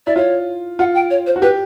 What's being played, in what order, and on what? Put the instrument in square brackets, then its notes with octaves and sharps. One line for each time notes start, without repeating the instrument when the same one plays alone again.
[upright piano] E4 [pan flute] D5
[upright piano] F4 [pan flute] C#5
[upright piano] F4 [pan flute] F#5
[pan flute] G5
C#5
C5
[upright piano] F#4
[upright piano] G4 [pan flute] B4